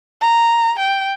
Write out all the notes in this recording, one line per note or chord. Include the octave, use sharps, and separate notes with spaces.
A#5
G5